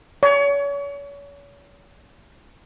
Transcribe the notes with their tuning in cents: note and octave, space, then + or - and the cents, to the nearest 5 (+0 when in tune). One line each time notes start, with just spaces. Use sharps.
C#5 +40